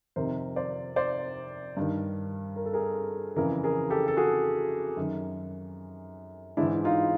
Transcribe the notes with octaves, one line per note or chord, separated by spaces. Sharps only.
F2 C3 D#3 A#4 C5
C5 D5
C5 D5
G2 D#3
A#4
A4
G#4 A#4
F2 C#3 E3 G#4 A#4
G#4 A#4
G4 A4
A4
F#4 G#4
F#2 D#3
G#2 E3 D4 E4
D#4 F4